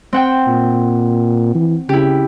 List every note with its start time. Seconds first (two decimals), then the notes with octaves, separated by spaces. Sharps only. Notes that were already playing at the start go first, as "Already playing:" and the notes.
0.13 C4 F#5 G5
0.47 A#2
1.55 E3
1.89 C#3 E4 G4